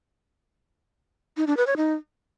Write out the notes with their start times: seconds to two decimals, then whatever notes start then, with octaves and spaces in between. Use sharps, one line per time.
1.37 D#4
1.47 D4
1.57 B4
1.67 C#5
1.77 D#4